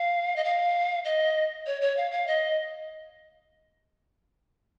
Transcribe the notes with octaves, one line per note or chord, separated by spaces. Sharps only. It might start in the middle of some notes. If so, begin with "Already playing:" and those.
Already playing: F5
D#5
F5
D#5
C#5
C#5
F5
F5
D#5